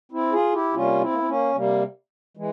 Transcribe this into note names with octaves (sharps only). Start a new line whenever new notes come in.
C4 E4
F4 G#4
E4 G4
C3 G3 A#3 C#4 F4
C4 E4
A#3
C4
A#3 C#4
C3 G3 A#3
E3 G#3